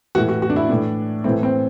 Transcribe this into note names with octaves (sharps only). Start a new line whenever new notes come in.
A2 E3 F#4
F#4
F#4
D4
E4
A2 E3 D4
A2 E3 C4
C4